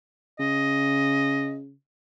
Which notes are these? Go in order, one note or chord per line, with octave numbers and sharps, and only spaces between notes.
C#3 D#5